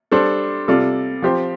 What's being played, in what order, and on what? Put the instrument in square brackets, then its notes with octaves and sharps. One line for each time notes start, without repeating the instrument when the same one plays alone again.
[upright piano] G3 D4 A4 C5
C3 G3 F4 A4 D5
F3 C4 G4 C5